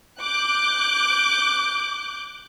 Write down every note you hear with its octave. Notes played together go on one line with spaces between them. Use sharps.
D6 F#6 G6